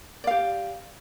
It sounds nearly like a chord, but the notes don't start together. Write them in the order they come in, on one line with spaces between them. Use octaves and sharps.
D5 F5 G4